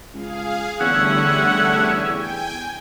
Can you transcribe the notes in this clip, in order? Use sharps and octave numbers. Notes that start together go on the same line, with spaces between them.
C#2 G#4 F5
E2 D3 G3 A3 C#4 E4 G#4 F#5
G5 G#5